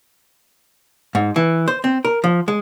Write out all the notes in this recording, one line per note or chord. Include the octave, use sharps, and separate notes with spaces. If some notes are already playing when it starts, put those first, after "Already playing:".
G#2
E3
C5
C4
A#4
F3
G#3